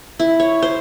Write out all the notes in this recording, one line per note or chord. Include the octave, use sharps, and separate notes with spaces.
E4
C#5
C5